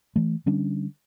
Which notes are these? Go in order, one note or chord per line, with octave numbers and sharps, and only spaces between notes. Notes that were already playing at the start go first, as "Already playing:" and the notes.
E3 A3
D3 G3 C#4 D4